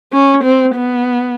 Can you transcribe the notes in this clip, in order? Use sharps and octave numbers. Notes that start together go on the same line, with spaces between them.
C#4
C4
B3